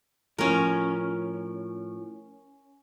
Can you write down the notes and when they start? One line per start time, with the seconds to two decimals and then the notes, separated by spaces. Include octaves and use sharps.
0.38 A2 F3 C#4 A#4